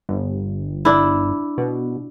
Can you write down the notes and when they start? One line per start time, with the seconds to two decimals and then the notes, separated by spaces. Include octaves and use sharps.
0.09 G1
0.85 D4 E4
1.58 B2